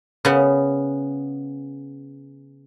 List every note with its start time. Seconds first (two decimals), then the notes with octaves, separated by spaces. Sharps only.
0.25 C#3 B3